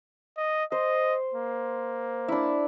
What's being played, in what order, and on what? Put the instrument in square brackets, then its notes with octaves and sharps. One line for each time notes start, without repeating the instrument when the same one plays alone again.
[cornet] D#5
[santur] C5 [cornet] D#5
[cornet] A#3
[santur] D4 E4